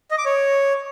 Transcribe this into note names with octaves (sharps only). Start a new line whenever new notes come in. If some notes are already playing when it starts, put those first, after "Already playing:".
D#5
D6
C#5